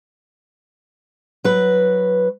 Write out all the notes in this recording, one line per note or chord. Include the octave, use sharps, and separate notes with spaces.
F#3 B4